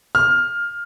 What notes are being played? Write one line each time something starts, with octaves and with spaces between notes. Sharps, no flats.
F6